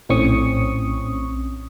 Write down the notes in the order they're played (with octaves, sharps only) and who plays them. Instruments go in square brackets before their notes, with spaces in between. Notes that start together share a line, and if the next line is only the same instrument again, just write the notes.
[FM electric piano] A#1 A2 C4 C#4 C#6 D#6